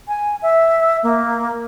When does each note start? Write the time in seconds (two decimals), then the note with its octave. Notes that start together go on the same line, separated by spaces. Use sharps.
0.08 G#5
0.42 E5
1.03 A#3